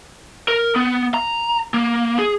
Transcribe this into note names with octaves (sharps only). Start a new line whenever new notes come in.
A#4
B3
A#5
A#3
G#4